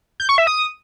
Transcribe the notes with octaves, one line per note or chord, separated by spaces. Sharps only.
G6
C#6
E5
D#6